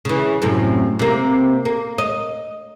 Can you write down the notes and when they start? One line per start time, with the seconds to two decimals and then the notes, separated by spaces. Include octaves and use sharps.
0.05 C#3 E3
0.42 F#2 A2 C3
0.99 C3 A#3
1.65 A#3
1.98 D#5